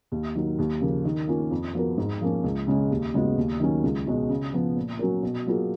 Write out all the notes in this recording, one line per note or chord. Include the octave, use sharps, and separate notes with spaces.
D#2
D#3 F#3
D#2
C#3 F3 A#3
D#3
A#3 C#4 F4
F2
F3 B3 F#4 A#4
G#2
F3 A#3 C#4
C#2
C#3 G#3 C#4
D#2
C#3 G#3 B3 F#4
D#2
D#3 F#3 C#4
C#2
B2 G#3 C#4 F#4
C#3
F3 B3
A#2
F#3 C#4 F#4 A#4
B2
F#3 A#3 F4 G#4